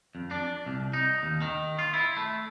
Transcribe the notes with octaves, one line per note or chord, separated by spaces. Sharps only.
F2
D4
C2
D#4
D#2
D#3
F4
E4
A3